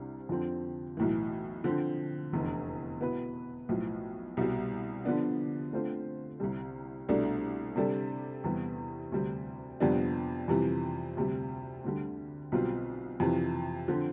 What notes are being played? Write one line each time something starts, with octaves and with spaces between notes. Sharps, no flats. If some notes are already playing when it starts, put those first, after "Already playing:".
Already playing: C2 C3 D4
F2 D3 F3 C4
B1 A2 E3
D3 F3 C4
F1 E2 D3
B2 B3 E4 B4
B1 A2 F3
C2 B2 G3
D3 F3 B3 D4
D3 A3 C4 F4 C5
C2 C3 G3
C2 B2 A3 D4
C3 G3 D4 A4
E2 C3 G3 B3
D2 C3 G3 C4
F2 C3 G3 B3 D4
F2 C3 E3 G3
D2 C3 G3
D2 D3 G3
B1 B2 G3 C4 F4
F2 C3 E3
D3 F3 C4